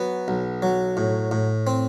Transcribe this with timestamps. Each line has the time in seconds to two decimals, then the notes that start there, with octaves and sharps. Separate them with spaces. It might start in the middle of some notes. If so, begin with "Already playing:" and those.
Already playing: F#3 B3
0.28 B1
0.62 F#3
0.97 A2
1.31 A2
1.67 C4